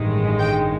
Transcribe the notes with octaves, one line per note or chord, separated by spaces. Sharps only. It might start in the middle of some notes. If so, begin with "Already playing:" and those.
Already playing: A1 G2 D#3 G#3
G5